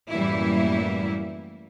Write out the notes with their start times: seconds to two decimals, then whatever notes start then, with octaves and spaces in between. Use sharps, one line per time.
0.10 F#2 A2 E3 G3 A#3 E4